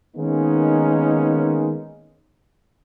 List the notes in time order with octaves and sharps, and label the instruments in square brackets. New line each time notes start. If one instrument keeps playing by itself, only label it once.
[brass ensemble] D#3 G#3 A#3 B3 C#4 D#4